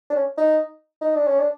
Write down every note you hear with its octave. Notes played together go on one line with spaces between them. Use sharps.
D4
C#4
D#4
D#4
D4
C#4
D4